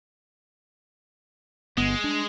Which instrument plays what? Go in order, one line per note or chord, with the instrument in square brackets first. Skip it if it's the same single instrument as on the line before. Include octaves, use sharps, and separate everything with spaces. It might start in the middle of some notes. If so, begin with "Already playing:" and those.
[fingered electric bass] G1 B3 [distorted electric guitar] G#3
[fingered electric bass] D4